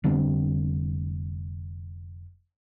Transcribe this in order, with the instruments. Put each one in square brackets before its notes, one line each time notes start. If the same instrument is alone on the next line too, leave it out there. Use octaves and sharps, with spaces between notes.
[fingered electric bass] F1 D3 G3 C4